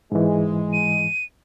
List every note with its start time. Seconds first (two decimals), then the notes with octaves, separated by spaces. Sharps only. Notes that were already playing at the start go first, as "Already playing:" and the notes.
0.12 G#2 E3 G#3
0.73 D#7